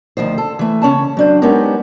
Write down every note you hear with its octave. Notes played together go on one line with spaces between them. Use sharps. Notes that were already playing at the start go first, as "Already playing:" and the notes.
D2 D#3 F3 C5
A4
E3 A3
C#3 C#4 C#5 A5
F#3 D4 C5
G#3 B3 C#4 D#4 G4 A#4